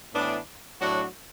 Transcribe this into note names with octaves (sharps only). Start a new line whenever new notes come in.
A2 E3 B3 D4
A2 F#3 D4 F#4